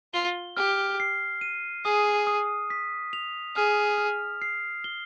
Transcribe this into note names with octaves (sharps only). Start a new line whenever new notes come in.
F4 G7
G4 F6
C7
D#7
G#4 D#6
D#6
B6
F7
G#4 F6
F6
C7
G7